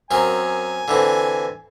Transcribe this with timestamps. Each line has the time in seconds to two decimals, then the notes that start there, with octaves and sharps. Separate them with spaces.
0.11 F#2 C4 A#4 G#5
0.88 D3 E3 C4